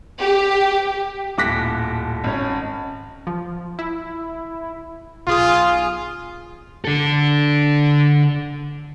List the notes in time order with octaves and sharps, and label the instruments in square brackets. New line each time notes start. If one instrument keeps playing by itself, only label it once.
[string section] G4
[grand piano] D#1 A2 D6 F#6 A#6 B6
G#1 C#4
[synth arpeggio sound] F3
E4
[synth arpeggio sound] B1 G#4 D#6 [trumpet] F4
[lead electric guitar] D3 A4